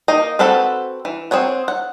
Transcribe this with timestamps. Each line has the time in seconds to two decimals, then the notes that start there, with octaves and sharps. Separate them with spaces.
0.08 A#3 D#4 D#5
0.39 C4 F#4 A4 B4 F#5
1.05 E3
1.31 C4 G#4 C#5 F#5
1.68 F#5